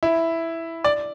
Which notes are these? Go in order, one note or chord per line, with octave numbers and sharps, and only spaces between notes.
E4
D5